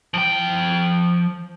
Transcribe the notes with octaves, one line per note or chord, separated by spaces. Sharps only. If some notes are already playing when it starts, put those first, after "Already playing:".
F3 G5